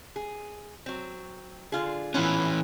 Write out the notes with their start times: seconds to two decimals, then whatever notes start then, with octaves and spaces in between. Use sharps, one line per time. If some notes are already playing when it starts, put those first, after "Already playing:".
0.16 G#4
0.86 F#3 C4
1.72 D3 F4 G#4
2.14 E3 B3 C#4 E4 F4